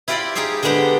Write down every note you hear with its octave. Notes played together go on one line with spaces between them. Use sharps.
E4 F4 G4 D5 B5 C6
D#4 G4 G#4 E5 F5
D3 G3 G#3 B3 G4